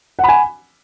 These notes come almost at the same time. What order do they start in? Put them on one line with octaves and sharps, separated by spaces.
F#5 B5 G#5